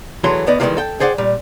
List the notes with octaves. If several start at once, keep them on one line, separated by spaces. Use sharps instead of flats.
D2 E3 F#3 A3 G#4 C6
D2 B3 D5 D#5
D#3 E3 G3 G#3 A#3 F4
A4 G5
G#4 C5 D5 F#5 G5
A#2 G3